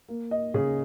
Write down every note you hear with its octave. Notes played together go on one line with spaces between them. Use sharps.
A#3
D#5
C#3 G#4